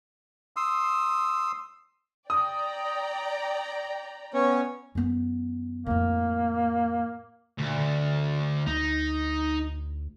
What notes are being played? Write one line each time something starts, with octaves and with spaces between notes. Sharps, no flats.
C6 D#6 E6
D5 G5 A#5 D#6
B3 C#4 C#5
F#2 B3
F2 A2 A#3
D2 A#2
D3
D2 D#4